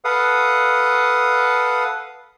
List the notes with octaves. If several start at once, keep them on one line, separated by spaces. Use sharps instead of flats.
A4 B4 F5 F#5 D#6